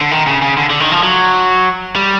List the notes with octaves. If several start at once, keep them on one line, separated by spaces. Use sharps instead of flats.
D3
D#3
C#3
C#3
D3
D3
D#3
F3
F#3
G3